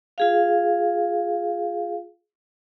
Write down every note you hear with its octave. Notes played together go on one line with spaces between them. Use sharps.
F4 G#4 F5